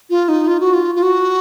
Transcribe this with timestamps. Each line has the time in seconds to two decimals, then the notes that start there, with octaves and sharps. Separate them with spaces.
0.10 F4
0.29 D#4
0.47 F4
0.60 F#4
0.74 F4
0.95 F4
1.03 F#4